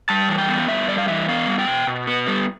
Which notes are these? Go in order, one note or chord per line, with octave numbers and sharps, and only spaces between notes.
G3 A5
E3
G5
B3
G2 E5
G3 D5
F5
E3 E5
B3 F5
G3
G5
B2
B2
B3
G3